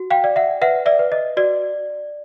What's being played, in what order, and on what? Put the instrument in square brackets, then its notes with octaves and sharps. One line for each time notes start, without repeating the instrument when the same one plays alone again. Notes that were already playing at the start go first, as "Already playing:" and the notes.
Already playing: [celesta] F#4
F5 G5
D5
E5 F#5
B4 E5 F#5
D5 E5
B4
D#5
F#4 D5